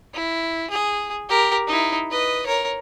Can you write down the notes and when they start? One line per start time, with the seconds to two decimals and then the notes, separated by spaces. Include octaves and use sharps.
0.14 E4
0.70 G#4
1.29 G4 A#4
1.67 D#4 E4
2.11 B4 D#5
2.46 A#4 C#5